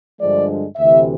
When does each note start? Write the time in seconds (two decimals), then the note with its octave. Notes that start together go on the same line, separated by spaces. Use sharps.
0.20 G2 D3 F3 G#3 D5
0.76 D2 C3 E3 E5